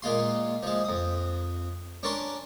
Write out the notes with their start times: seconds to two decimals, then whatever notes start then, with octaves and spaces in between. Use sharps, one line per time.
0.02 A#2 G#3 F4 C6
0.63 F3 G#3
0.84 F2 D#6
2.03 C#4 D4 A#4 A5 C6 C#6